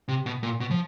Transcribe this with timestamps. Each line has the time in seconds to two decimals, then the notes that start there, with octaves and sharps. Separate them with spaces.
0.08 C3
0.26 B2
0.43 A#2
0.60 B2
0.70 F3